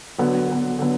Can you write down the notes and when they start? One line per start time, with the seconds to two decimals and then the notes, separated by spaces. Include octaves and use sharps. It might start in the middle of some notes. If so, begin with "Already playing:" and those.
0.18 D3 F#3 B3
0.48 D3 F#3 B3
0.79 D3 F#3 B3